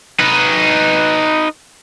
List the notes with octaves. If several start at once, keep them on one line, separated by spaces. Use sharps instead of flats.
D#4 B4